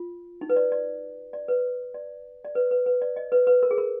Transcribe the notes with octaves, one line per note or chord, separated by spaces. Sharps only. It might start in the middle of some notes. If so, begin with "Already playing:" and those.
Already playing: F4
D#4
B4
D5
D5
D5
B4
D5
D5
B4
B4
B4
D5
D#5
B4
B4
A#4
G#4
A#4